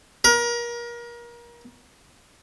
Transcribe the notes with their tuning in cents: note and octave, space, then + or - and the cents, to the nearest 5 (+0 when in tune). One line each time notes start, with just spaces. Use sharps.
A#4 +30